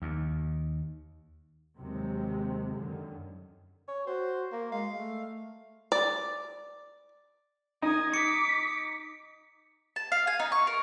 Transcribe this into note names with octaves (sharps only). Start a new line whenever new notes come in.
D#2
D#2 C3 D#3 F#3 G#3
F#2 D3 D#3
C#5
F#4 C5
A#3
G#3 F5
A3
D5
D#4 D#6 G#6
D6 B6 C#7
A5
F5
G#5
D#4
C#6
A#4